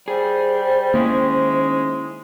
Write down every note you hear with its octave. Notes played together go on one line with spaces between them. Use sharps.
G3 G#4 C5
D#3 G#3 A#3 C#4 E4